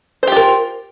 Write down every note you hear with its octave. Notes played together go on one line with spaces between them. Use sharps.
F4 G4 A#4 C5